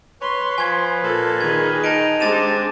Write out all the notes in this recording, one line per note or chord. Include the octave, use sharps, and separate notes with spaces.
B4 C#5 C6
F3 G#5 G#6
A#2 A4
D#3 G#4 G#6
D#4 A5 D7
G#3 C4 D4 G4 A5 A6 D#7 E7